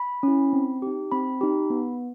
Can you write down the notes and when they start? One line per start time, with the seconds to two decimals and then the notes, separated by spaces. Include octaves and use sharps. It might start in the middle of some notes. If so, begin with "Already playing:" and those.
Already playing: B5
0.23 C#4 E4
0.53 C4
0.82 D#4 G4
1.12 C4 B5
1.41 D#4 G4
1.70 B3